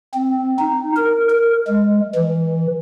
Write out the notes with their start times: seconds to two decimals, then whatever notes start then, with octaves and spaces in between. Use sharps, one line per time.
0.14 C4
0.59 D#4
0.96 A#4
1.30 A#4
1.68 G#3
2.15 E3